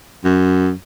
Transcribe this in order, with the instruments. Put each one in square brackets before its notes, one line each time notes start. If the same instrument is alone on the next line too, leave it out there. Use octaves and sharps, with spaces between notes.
[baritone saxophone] F#2